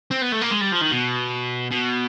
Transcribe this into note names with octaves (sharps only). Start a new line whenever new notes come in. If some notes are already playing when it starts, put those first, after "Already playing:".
C4
B3
A3
A#3
G#3
G3
F3
D#3
B2
B2